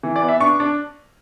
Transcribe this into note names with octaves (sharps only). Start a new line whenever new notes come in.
E3
D5
B3
E5
D4 C#6
D4